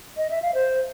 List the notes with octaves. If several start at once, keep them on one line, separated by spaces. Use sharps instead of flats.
D#5
E5
F5
C5